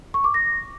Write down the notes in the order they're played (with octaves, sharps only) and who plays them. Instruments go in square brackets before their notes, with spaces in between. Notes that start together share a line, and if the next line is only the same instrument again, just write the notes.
[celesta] C#6
D6
A#6